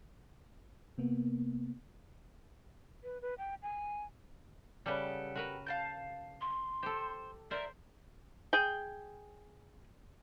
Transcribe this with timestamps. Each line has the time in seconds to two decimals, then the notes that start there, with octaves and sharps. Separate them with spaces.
0.98 C3 A#3 B3
3.02 B4
3.22 B4
3.38 G5
3.62 G#5
4.86 C#3 G3 B3 G4 A4
5.36 F#4 A#4 B4
5.67 F5 A5 G6
6.41 C6
6.83 G4 A4 C5
7.51 A#4 C5 D5 E5
8.53 G#4 G5